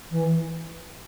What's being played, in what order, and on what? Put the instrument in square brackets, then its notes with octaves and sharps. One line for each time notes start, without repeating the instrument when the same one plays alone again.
[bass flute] E3